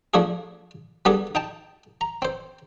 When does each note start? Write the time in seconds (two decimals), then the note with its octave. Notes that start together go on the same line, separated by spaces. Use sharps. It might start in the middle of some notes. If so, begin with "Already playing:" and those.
0.14 F3 A3 D4 E4 G#4
1.05 G3 B3 D4 G#4 A4
1.35 D#4 G5 A5
2.01 A#5
2.22 C4 C5